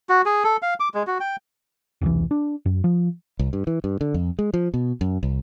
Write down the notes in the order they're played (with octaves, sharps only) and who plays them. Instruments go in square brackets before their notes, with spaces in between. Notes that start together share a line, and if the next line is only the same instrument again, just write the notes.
[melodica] F#4
G#4
A4
F5
D6
G#3
F#4
G5
[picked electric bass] E1 C2 E3
D4
F#2
F3
[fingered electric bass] C2
G2
E3
G2
D3
F2
G#3
F3
B2
F#2
C2